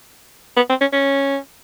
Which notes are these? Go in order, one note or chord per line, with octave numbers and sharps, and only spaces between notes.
B3
C4
C#4
C#4